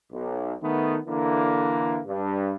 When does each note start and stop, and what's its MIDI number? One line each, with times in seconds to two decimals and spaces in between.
0.12 0.54 35
0.62 0.98 51
0.62 0.98 57
0.62 0.98 59
1.07 1.99 50
1.07 1.99 52
1.07 1.99 58
2.04 2.53 43